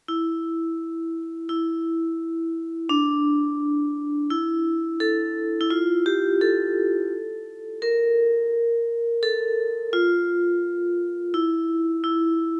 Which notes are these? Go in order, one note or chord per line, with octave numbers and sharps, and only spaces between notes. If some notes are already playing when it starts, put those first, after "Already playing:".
E4
E4
D4
E4
A4
E4
F4
G4
A4
A#4
A4
F4
E4
E4